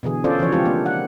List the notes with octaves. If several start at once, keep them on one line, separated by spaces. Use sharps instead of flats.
B2 D3 E3 G#4
C#4 D4 F4 A4 C5 D5
C#3 E3 F3 C#5
F3 G#3 C4 D4 F4 G4
A#3 B3 D4
F#5